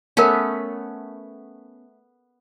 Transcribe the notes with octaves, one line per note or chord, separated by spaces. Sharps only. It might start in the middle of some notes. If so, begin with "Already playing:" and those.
A3 B3 C#4 A#4 C#5